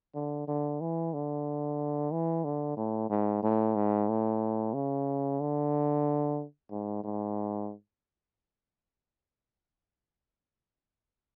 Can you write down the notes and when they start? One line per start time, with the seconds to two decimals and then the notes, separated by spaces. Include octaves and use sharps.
0.15 D3
0.48 D3
0.81 E3
1.14 D3
2.12 E3
2.44 D3
2.77 A2
3.10 G#2
3.43 A2
3.75 G#2
4.09 A2
4.74 C#3
5.40 D3
6.71 G#2
7.04 G#2